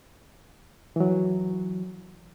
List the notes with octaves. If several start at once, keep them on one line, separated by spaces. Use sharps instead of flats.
E3 F#3